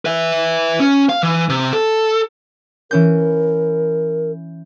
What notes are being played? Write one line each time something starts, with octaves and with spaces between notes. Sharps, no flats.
B4 E5
C#4
F5
E3
C3
A4
E3 C#4 A#4 G6